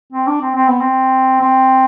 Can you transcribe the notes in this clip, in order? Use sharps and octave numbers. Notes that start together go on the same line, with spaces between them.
C4
D4
C4
C4
B3
C4
C4